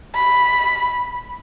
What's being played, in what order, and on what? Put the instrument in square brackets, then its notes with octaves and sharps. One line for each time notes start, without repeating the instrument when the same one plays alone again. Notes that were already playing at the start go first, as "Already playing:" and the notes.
[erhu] B5